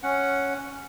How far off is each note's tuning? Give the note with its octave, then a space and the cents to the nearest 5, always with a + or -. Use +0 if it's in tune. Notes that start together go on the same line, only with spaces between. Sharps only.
C#4 +0 F#5 +0